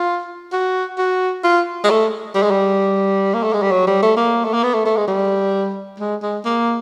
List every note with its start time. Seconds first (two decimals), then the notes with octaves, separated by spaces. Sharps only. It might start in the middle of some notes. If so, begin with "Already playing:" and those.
Already playing: F4
0.53 F#4
0.98 F#4
1.44 F4
1.84 G#3
1.90 A3
2.35 G3
2.43 G#3
2.51 G3
3.34 A#3
3.43 A3
3.53 G#3
3.62 G3
3.71 F#3
3.87 G3
4.02 A3
4.17 A#3
4.44 A3
4.54 A#3
4.63 B3
4.74 A3
4.85 A3
4.97 G#3
5.08 G3
6.00 G#3
6.22 G#3
6.45 A#3